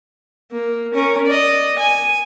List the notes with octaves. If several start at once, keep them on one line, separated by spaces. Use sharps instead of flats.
A#3
C#4 A#4
D5 D#5
G#5